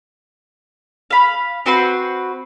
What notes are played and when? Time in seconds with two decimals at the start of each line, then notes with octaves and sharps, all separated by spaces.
1.11 F5 B5
1.66 C4 F#4 B4 C6